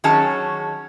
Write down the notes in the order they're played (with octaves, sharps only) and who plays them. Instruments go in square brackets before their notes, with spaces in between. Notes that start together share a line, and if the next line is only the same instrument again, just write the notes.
[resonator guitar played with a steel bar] D#3 F#3 C#4 G#4 A5